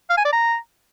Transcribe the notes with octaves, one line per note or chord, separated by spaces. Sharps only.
F5
G#5
D5
A#5